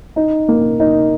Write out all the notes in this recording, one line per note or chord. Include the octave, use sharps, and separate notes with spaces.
D#4
A#3
D#4